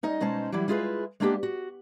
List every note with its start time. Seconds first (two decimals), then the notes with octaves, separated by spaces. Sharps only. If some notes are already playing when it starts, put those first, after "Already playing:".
0.03 C#4 D#4 D#5
0.21 B2 G#3 C#4 D#4 C5 A5
0.52 E3 F#3 G3 E4
0.68 G#3 E4 F4 G#4 A#4 B4
1.20 G#3 A#3 B3 D4 F#4 G4
1.43 F#4